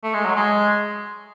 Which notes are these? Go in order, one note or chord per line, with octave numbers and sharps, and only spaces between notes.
A3
G#3
F#3
G#3